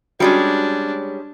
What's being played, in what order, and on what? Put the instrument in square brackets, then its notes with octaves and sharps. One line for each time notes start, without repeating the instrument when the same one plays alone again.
[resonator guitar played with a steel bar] G3 G#3 C#4 [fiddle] D4 [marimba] F#4